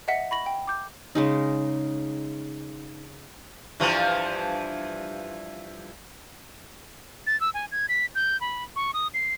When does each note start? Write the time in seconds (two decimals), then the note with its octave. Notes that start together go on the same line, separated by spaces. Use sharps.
0.08 D#5 E5 F#5 B6 C#7
0.31 B5 C#6 A#6 F#7
0.46 G5
0.67 D6 G6
1.15 C#3 G#3 D#4
3.80 G2 E3 F3
7.27 A6
7.41 E6
7.54 G#5
7.72 G#6
7.89 B6
8.15 G6
8.41 B5
8.76 C#6
8.94 D#6
9.14 C7